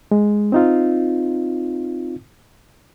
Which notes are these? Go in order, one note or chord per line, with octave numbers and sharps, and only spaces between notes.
G#3
C4 D#4 F4